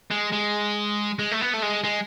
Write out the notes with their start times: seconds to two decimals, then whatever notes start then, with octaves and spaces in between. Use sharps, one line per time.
0.11 G#3
0.33 G#3
1.19 G#3
1.32 A3
1.41 B3
1.53 A3
1.62 G#3
1.84 G#3